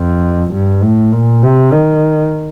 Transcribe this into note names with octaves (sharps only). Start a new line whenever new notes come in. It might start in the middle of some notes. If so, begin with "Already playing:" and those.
Already playing: F2
G2
A2
A#2
C3
D#3